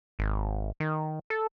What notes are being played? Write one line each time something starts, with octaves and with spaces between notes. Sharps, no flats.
G#1
D#3
A4